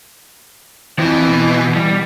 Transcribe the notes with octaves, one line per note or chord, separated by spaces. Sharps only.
F2 E3 C4
B2
G3